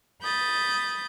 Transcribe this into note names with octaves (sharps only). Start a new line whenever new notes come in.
B5 D#6 G6 A6